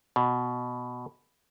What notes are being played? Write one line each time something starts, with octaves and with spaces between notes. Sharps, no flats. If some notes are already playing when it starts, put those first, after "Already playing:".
B2